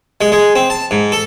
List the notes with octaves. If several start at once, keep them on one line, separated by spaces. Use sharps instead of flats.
G#3
G#3
C4
A5
G#2
A4